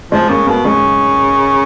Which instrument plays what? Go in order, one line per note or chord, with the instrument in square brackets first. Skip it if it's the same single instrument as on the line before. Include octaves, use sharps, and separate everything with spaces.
[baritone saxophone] F3 [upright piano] G#3
[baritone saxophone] C#3 [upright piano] A#3
[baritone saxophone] B2 [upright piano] A#3
[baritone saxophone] C#3 [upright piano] G#3